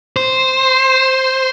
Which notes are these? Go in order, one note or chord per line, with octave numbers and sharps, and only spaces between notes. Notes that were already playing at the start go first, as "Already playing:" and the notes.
C5